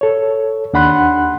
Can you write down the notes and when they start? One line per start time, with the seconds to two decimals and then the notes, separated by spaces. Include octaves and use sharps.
0.01 A4 C#5
0.73 D#2 D4 F#5 B5 C6 F#6